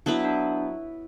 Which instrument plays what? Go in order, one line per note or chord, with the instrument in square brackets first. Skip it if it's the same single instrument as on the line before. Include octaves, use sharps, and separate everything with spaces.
[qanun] F#3 B3 E4 B4 [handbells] D4
[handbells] D4